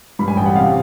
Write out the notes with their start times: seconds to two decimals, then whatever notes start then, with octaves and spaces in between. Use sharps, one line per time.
0.19 G2 B5
0.28 G#5
0.37 A1 G5
0.46 F#5
0.55 C3 F5